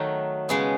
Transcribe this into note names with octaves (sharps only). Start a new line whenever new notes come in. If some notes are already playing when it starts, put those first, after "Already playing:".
Already playing: D#3 F#3 A3 D#4
C#3 G#3 B3